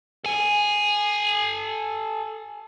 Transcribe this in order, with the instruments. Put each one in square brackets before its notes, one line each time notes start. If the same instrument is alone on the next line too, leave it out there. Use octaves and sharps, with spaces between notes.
[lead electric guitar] A4 G#5